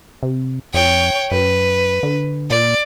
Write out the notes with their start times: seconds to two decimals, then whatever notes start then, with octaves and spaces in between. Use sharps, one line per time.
0.23 C3
0.74 F2 C#5 G5
1.31 F#2 B4
2.03 D3
2.50 A#2 D5